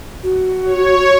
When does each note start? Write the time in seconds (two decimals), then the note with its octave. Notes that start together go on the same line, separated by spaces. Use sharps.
0.23 F#4
0.65 C#5